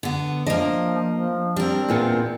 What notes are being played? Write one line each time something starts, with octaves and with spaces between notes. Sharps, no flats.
D3 B3
F3 A#3 D4 D#5
F3
G3 C4 D4 A#4
E2 A#2 B3